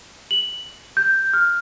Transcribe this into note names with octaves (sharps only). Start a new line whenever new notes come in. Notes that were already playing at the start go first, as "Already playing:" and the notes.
F#7
G6
F6